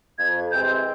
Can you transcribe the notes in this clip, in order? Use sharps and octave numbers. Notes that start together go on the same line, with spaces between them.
F2 G#6
C3 E3 G#3 C4 G6